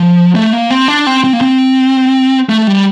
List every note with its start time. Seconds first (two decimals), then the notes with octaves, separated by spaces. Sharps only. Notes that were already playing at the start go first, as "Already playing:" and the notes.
Already playing: F3
0.35 A3
0.53 A#3
0.70 C4
0.88 D4
1.07 C4
1.24 C4
1.33 A#3
1.41 C4
2.49 A3
2.67 G3